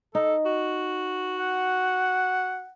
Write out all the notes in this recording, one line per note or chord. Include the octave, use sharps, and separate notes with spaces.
D#4 A4
F#4
F#5